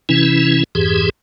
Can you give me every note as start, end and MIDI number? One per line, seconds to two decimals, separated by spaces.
0.09 0.64 48
0.09 0.64 52
0.09 0.64 61
0.09 0.64 64
0.75 1.10 41
0.75 1.10 44
0.75 1.10 52
0.75 1.10 67
0.75 1.10 68